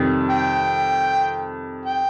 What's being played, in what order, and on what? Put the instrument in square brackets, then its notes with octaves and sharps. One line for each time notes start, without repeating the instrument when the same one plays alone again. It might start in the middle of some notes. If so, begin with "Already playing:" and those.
Already playing: [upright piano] F2 C3 D#3 G3
[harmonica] G5
G5